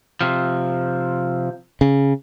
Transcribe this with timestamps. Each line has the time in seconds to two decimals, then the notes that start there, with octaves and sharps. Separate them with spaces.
0.21 C3 F3
1.81 C#3